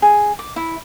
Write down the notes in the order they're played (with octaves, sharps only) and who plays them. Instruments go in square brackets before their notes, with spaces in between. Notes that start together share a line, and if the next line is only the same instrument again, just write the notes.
[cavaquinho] G#4
D6
E4